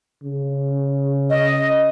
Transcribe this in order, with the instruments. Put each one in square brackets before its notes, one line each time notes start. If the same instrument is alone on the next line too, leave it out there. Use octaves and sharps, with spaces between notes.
[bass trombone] C#3
[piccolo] D#5